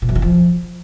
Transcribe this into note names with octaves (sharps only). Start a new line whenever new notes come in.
A#2
F#2
D#3
F3